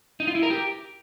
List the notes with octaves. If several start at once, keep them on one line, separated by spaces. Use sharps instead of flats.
D#4
F4
E4
A#4
G4